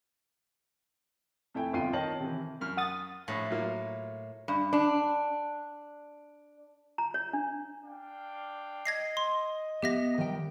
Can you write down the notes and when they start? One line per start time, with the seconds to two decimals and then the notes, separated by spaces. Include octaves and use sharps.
1.54 F2 A3 E4 G5 G#5
1.73 G1 F2 F4 G5 C7 D#7
1.93 D#3 C#5 D#5 G5 A5 F#7
2.20 C3 E3
2.61 F#2 F6
2.77 F#5 D#6 A6
3.28 A#1 A2
3.51 F#3 A#3 F4
4.48 G2
4.73 D4
6.98 A#5
7.14 C#5
7.33 D4
7.85 D4 F5 G5
8.85 D#5 G#6 A#6 C7
9.17 C6
9.82 B3 G4 E5 A#6
10.18 D#3 G3 G5